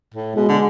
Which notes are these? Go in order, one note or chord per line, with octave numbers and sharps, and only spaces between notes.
A2
B2 G#3
D3